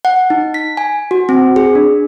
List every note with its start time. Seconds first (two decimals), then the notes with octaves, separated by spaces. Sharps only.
0.05 F#5
0.30 D#4
0.54 B6
0.77 G#5
1.11 F#4
1.29 C4
1.56 G#4
1.75 D4